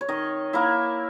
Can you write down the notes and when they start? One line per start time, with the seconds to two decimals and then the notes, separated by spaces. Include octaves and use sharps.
0.01 C#5
0.09 D#3 D#5
0.53 A#3 E4 E5